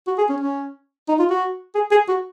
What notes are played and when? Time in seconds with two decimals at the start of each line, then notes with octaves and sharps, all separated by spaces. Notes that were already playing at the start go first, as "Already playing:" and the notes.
0.07 F#4
0.18 G#4
0.30 C#4
0.40 C#4
1.08 D#4
1.19 F4
1.30 F#4
1.75 G#4
1.91 G#4
2.09 F#4